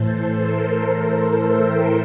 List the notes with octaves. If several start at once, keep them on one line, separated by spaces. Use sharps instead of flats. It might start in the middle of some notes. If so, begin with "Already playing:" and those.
Already playing: A2 E3 A4 C5
A4
A#4
A#4
A4 C5
C5 E5
E5 G5